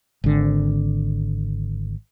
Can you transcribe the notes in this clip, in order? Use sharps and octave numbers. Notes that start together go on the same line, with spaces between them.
G#1 D3